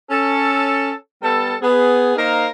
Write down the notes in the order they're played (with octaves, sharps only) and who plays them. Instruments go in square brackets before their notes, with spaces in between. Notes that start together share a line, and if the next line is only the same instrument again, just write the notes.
[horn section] C#4 A4
G3 B3 A4
B3 G#4
A#3 D#4 A#4 C5 F5